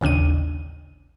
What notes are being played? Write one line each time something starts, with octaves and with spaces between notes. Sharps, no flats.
A1 D#2 C#3 D4 D#7